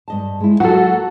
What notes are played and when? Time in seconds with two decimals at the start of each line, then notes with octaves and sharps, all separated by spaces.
0.08 G2 D#5 A5
0.40 G#3 E4
0.60 F#3 E4 F#4 A4 B4
0.92 A#3